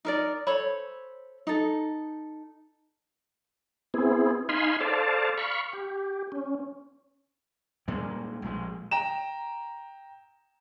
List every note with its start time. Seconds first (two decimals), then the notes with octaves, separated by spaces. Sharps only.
0.05 D#4 A#4 D5
0.47 A4 C5 C#5 B5
1.47 D#4 A4
3.94 B3 C4 E4 G#4
4.49 D#4 F5 G#5 B5 C6
4.81 A4 C5 D5 F5 A5
5.38 F5 B5 C#6
5.73 G4
6.32 C#4
7.88 A#2 G3 G#3
8.42 A#1 G#3
8.91 G5 A#5 E7